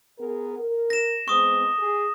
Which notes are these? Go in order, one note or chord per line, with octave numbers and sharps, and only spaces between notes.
B3 G#4 A#4
A#4
A#6 E7
G#3 B3 C4 C#6 D#6
G#4